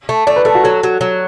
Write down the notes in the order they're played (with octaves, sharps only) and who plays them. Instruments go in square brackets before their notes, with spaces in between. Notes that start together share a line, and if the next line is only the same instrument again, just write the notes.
[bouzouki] A3
[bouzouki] A3 [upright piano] D5
[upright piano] B4
[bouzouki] A3 [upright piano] A4
[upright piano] F#4
[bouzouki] F#3 [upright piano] A4
[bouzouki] F#3
F#3